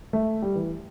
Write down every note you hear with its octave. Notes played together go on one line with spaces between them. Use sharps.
A3
G3
E3